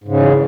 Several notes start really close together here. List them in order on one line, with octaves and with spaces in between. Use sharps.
G#2 C#3 E2